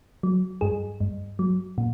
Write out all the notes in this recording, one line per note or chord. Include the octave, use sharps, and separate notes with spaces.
F#3
G2 G#4
G2
F#3
A#2